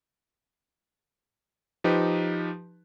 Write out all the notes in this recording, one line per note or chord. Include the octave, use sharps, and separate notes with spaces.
F3 D#4 G4 B4